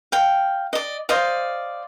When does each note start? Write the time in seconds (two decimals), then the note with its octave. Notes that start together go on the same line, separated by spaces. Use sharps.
0.12 F5 G5
0.73 D5 D#5
1.09 C5 D5 D#5 F5